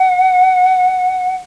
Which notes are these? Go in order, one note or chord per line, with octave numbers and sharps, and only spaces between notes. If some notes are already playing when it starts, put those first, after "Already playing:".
Already playing: F#5